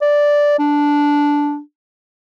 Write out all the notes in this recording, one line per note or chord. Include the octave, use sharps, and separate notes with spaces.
D5
D4